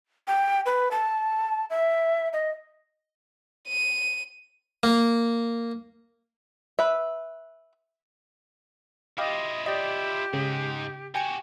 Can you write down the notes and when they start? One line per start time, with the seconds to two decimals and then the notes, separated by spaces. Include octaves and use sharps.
0.28 G5
0.66 B4
0.91 A5
1.70 E5
2.33 D#5
3.68 D#7
4.83 A#3
6.79 B4 E5
9.18 E4 F4 G4 D#5 F5
9.66 G4 D5 D#5
10.33 G#2 C#3 G#3
11.15 F#4 G4 G5 G#5 C#7